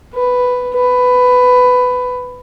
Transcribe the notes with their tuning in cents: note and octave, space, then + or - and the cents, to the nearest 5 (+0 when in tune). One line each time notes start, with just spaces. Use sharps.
B4 +5
B4 +15